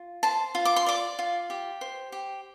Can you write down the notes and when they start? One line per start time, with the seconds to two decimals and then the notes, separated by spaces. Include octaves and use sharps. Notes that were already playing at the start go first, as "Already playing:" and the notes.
Already playing: F4
0.23 C5 A5
0.55 F4
0.65 D6
0.76 C6
0.86 D5 D6
1.19 F4
1.50 G4
1.81 C5
2.12 G4